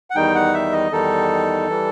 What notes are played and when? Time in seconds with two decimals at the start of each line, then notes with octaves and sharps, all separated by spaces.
0.10 F#5
0.15 E2 D#3 G3 D#4 G5
0.35 F#5
0.54 E5
0.72 D#5
0.91 E2 D#3 G3 D#4 A4
1.69 E3 G3